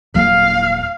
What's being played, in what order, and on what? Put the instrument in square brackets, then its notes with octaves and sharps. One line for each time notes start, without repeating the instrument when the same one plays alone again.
[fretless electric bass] D#1 F#3 A#3 [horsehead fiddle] F5